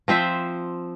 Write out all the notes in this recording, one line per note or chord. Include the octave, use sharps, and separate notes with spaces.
F3 C4 C5 E5